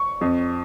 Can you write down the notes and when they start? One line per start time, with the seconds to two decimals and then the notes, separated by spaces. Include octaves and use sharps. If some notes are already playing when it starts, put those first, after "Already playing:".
Already playing: C#6
0.21 F2